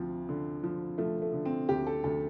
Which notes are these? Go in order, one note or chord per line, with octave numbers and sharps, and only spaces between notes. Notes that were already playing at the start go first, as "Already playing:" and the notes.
Already playing: D2 F3 C4
D3
F3
F3 A3
A3
D3
C4
D2 G4
A4
D2 A4